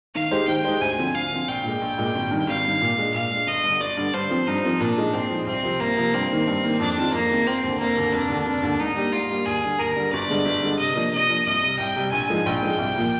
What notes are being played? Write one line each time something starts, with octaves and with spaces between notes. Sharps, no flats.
D#3 F5
G#3 D#4 G4 C5
D#3 G5
G#3 D#4 G4 C5
D2 G#5
D3 F3 C4
D2 F5
D3 F3 C4
A#1 G5
A#2 G#3
A#1
A#2 G#3
G#1
G2 D#3
G#1 F5
G2 D#3
A#2
G#3 D4
A#2 F5
G#3 D4
G1 D#5
G2
D3
G1 D5
G2 D3
G2 C5
F3 C4
G2 D#4
F3 C4
A#2 D4
F3 G#3 D#4 G#4
A#2 C4
F3 G#3 D#4 G#4
C2 C4
C3 F3
C2 A#3
C3 F3
G2 C4
D#3 A#3
G2
D#3 A#3
F2 D4
D#3 G#3 C4 F4
F2 A#3
D#3 G#3 C4 F4
F1 C4
D#2 D3
F1 A#3
D#2 D3
F1 D4
D#2 D3
F1
D#2 D3
G#2 D#4
G3 A#3 D4 G4
G#2 F4
G3 A#3 D4 G4
D#2 G#4
D3 G3
D#2 A#4
D3 G3
G1 D5
G2 D3 G#3
G1
G2 D3 G#3
C3 D#5
F3 A#3 D4
C3 D#5
F3 A#3 D4
C2 D#5
C3 G3
C2 G5
C3 G3
A#1 G#5
G#2 F3 G#3
A#1 G5
G#2 F3 G#3
C2
A#2 F3 A#3